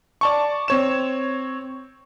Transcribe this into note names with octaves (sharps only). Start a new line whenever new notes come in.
D5 A5 C#6
C4 C#5 E7